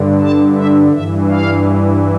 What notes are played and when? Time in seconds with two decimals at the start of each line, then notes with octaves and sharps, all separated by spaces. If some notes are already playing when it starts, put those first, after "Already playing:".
Already playing: G2 D3
0.21 A5
0.56 E5
0.92 G2 E3 E5
1.29 F5